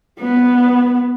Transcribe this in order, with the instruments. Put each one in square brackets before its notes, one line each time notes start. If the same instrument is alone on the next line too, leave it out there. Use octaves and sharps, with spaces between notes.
[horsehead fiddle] B3